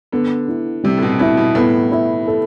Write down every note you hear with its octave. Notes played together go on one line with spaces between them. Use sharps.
D3 B3
E4
C3 G3
A2
B2
B2 E4
B2
A2 B3
E4
A4